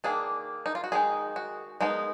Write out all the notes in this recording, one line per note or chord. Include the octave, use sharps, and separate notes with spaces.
D#3 A#3 D4 G#4
D#4
F4
F#4
D#3 G#3 D#4 G#4
F#4
G#3 B3 D#4 A#4